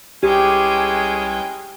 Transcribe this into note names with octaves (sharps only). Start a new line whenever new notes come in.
C2 G2 G#3 C#4 G4 G#4 G5